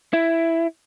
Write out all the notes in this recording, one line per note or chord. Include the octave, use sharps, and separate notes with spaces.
E4